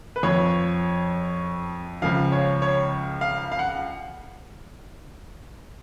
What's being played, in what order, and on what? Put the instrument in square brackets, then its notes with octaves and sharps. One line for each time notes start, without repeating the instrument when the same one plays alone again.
[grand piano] B4
F2 F3 C#5
C#2 C#3 F3 F5
C#5
C#5
F5
F5
F#5